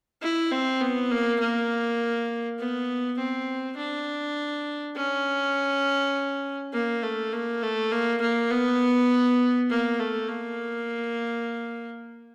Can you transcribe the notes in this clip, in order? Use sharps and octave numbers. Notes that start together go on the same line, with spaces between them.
E4
C4
B3
A#3
A#3
B3
C4
D4
C#4
A#3
A3
A#3
A3
A#3
A#3
B3
A#3
A3
A#3